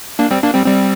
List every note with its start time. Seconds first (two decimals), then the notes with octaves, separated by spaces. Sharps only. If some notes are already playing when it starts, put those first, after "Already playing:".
0.19 A#3 D4
0.31 G3 C4
0.42 A#3 D4
0.54 G3 C4
0.66 G3 C4